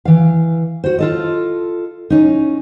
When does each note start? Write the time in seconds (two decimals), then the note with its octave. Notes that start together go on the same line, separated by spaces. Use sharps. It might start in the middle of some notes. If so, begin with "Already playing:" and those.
0.05 E3 F5
0.84 F#4 C5
0.98 F4 A4 D#5
2.10 C#4 D#4